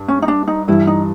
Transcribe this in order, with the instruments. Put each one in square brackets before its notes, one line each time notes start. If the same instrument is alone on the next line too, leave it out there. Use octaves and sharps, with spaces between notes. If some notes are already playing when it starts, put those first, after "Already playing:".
Already playing: [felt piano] G2
[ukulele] C#4
D#4
D4
D#4
[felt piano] G2 E3 G3 [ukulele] E4
[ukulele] D#4